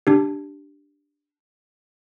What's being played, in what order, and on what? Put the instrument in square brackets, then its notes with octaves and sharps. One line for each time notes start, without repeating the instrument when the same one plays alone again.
[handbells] D4 G4